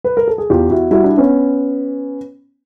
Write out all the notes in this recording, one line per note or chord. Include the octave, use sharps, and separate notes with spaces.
B4
A#4
A4
G#4
E2 F4 G4
E2 E4 F#4
G3 E4 F#4
D4 E4
B3 C#4